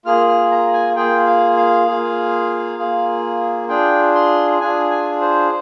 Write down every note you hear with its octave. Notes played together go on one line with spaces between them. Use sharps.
A#3 F4 G#4 F6
F6
A#5
G#5
A#3 F4 G#4 G5
F5
F5
A#3 F4 G#4
A#3 F4 G#4
D4 F4 G#4 G5
C6
D4 F4 G#4 G#5
G#5
C5